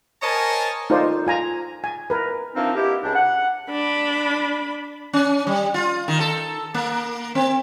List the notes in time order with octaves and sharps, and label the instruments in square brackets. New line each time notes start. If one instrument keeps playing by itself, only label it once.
[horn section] A#4 C5 C#5 D#5 G#5 A5
[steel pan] D#4 F4 A4 A#4 C5 D5
F4 G#5 A#5
G#5
A#4 B4
[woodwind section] E3 F3 A#3 C4 D4 D#4
B2 A#3 E4 G4
C#2 D4
F#5
[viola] D4 B5
[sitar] C#4
G3
F4
D#3
A4
A#3
C4